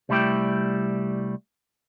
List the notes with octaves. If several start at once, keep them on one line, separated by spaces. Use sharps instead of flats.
C2 G3 A3 E4 G4 G5